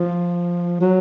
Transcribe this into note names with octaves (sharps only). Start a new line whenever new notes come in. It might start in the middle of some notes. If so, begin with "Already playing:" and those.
Already playing: F3
F#3